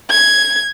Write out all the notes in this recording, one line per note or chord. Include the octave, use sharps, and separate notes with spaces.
G#6